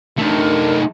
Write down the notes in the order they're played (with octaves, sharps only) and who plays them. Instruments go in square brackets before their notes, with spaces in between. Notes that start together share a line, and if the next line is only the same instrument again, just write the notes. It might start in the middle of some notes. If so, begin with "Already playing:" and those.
[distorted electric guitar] A3 D#4 [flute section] D4 A#4